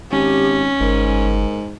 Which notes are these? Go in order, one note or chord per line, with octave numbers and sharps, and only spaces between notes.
G#1 C#4 G4
G1 G#2 A#4